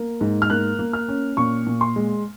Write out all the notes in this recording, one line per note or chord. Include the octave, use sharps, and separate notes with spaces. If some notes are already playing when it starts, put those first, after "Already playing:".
Already playing: A#3
G#2
F6
A#3 F#6
A#3
F6
C#4
A#2 C#6
A#2
C6
G#3